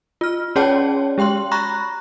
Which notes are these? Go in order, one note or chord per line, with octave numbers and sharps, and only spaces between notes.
F4 F6
C#4 G#4 C#5 D5 G5 A5
G#3 G4 G5 C6 F#7
A#5 B5 C#6 F#6 A#6